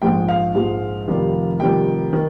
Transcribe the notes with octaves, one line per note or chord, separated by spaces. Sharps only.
A#1 G#2 F3 G#3 G5
F5
A#1 G#2 F3 G#3
F1 F2 D#3 G3
F1 F2 D#3 G3 G5
D#3